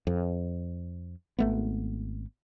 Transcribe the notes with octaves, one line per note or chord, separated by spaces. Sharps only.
F2
G#1 A3 B3